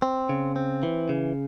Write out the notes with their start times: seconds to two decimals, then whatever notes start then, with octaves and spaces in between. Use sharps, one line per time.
0.02 C4
0.29 C#3
0.56 C4
0.83 E3
1.09 C#3